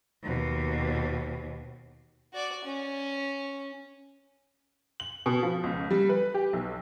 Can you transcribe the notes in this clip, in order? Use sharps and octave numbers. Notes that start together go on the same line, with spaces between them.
D#2 B2
F#4 D5
C#4
F#7
B2
F3
C#2
G3
B4
G4
B1